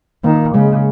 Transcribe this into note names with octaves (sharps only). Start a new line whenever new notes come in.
D#3 A#3
C#3 G#3